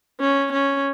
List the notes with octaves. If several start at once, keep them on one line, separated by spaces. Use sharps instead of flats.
C#4
C#4